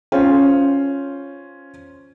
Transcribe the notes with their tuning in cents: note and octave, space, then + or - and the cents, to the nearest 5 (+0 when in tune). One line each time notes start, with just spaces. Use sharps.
C#4 +0 F4 +0 C5 +0